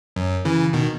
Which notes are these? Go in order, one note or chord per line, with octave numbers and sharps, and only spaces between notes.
F#2
C#3 E3
B2 D#3